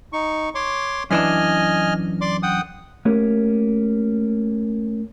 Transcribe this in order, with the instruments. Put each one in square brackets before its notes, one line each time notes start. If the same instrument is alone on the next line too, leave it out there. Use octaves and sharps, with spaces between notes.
[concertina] D#4 C#6
C#5 C6 D6
[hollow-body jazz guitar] F#2 E3 D4 [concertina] D#5 G#5 F6
[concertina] D5 C6 D6
F#5 G5 D#6
[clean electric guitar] A3 A#3 C#4 G4 A#4